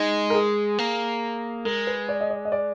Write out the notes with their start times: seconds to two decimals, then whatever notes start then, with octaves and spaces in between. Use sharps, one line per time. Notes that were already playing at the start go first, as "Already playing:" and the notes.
Already playing: G#3 D#4
0.30 A#4
0.34 G#4
0.78 A#3
1.65 G#3 A#4
1.87 B4
2.09 D5
2.21 D#5
2.30 D5
2.45 D#5
2.52 D5